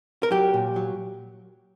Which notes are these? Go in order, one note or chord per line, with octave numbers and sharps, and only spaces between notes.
A#4
F#3 G4
A#2
F#3